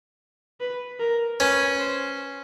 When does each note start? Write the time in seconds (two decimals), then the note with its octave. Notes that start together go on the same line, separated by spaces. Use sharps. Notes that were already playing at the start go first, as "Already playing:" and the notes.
0.60 B4
1.00 A#4
1.40 C#4 B4
1.80 C5